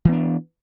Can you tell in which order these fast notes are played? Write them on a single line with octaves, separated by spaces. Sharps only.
E3 B3 D4